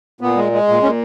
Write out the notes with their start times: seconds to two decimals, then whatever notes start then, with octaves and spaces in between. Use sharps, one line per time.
0.21 A#2 B3
0.36 G#3
0.52 G#3
0.68 A#2
0.83 A#2 C#4